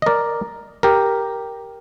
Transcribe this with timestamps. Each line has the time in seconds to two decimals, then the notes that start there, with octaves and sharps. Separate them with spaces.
0.02 D#5
0.06 A#4 D5
0.83 G4 A#4